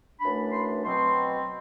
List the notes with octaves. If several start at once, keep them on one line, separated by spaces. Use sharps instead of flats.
F#2 E3 A3 D4 B5
C6
B2 F#3 C4 C6